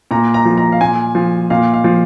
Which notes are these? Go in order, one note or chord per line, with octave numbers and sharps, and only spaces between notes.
A#2 A#5
A#5
F3
A#5
F5
A#2 G#5
F3
A#2 F5
F5
F3